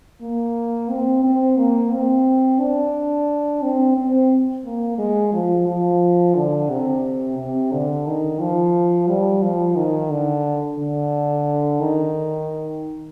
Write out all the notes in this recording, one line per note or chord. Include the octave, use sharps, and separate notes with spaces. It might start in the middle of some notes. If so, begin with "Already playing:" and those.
A#3
C4
C4
A#3
C4
D4
C4
C4
A#3
G#3
F3
F3
D3
C3
C3
D3
D#3
F3
G3
F3
D#3
D3
D3
D#3